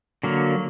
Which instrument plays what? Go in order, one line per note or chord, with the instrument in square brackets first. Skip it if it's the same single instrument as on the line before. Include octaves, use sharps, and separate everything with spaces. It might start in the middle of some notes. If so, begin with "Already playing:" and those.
[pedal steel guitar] D3 F#3 A#3